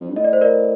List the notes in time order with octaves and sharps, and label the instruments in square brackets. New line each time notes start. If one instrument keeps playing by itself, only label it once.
[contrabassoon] F2
G2
[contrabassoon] A2 [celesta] D#5
[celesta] D5
C5
A#4 D5